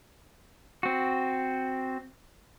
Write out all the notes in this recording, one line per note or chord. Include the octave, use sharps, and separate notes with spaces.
C4 F#4